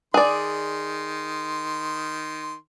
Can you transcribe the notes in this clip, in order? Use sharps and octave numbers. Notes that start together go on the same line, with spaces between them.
D#3 G#4 D5 C6